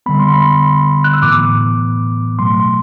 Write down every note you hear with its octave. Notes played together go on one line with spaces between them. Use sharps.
D3 G3 B3 B5
C6
B5
F#6
E6
A2 E3 B3 D6
B2 F#3 A3 C6